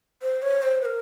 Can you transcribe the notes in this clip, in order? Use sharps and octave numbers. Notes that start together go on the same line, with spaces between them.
C5
C#5
C5
B4
A#4